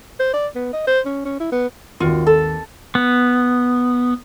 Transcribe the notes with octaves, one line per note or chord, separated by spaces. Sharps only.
C5
D5
B3
D#5
C5
C#4
C#4
E4
B3
G#1 D#2 F4 F#4
A4
B3